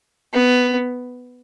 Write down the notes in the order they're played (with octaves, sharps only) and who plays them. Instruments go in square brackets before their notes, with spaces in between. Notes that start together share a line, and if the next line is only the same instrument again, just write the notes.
[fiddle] B3